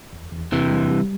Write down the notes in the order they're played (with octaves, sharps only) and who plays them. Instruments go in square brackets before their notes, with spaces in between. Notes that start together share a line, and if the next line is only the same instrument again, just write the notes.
[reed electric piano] E2
E2
[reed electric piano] E2 [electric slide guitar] C3 E3
[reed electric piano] G3
G3